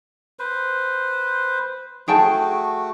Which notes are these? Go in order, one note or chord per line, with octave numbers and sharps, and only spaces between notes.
B4 C5
A3 F#4 G#4 G5 A5